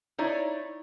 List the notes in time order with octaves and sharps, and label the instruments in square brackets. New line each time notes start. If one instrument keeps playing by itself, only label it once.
[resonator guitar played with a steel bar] D#4 E4 C#5 D5